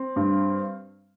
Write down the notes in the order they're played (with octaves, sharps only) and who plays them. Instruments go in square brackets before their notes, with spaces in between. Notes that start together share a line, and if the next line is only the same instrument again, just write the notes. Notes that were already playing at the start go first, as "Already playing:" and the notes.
Already playing: [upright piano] C4
G2